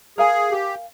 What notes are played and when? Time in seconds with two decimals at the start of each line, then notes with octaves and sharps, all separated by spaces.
0.18 G#4 A#4 F5 G#5
0.51 G4